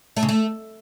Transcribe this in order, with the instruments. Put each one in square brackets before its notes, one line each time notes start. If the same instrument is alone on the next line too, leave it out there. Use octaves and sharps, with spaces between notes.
[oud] A3
C#3
A3